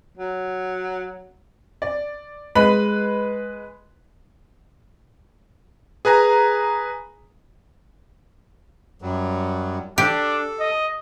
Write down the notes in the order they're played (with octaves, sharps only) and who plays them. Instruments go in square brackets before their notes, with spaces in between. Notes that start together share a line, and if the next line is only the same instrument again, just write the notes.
[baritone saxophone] F#3
[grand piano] D5
G#3 B4 B5
[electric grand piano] G#4 B4 G#5 A#5
[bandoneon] F#2 F#3 G3
[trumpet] D4 [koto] G4 [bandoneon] A4
[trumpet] D#5